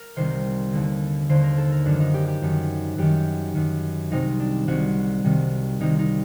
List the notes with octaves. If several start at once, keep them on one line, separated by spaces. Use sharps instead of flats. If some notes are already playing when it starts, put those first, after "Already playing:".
Already playing: A#4
C2 C3 D#3 C5
D#2 D3
D#2 D3 C5
A#4
A4
A#4
F#2 D#3 D4
D#4
G4
G4
F#2 D#3
F#2 D#3 G4
F#2 D#3
C2 C3 D#3 D#4
D4
C2 C3 D#3 F#4
C2 C3 D#3
C2 C3 D#3 D#4
D#4